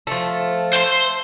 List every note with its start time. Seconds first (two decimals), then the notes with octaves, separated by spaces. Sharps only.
0.07 F3 A3
0.73 C5 C6